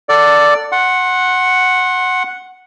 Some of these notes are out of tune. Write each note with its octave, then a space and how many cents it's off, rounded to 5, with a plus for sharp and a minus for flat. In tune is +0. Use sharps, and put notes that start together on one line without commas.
A4 +20 D5 +0 F#5 -5
F#5 +0 C6 +30